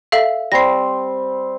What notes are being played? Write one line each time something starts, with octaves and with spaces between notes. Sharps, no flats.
A4 E5 F5
G3 C4 C6 A#6 C7